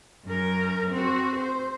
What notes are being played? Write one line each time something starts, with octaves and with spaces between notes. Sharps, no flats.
F#2 A#4
C4 F#4
C5